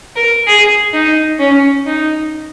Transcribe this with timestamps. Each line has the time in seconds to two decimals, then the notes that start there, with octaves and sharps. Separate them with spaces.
0.16 A#4
0.47 G#4
0.93 D#4
1.39 C#4
1.86 D#4